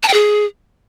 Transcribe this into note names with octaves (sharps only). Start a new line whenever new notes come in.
A5
G5
G#4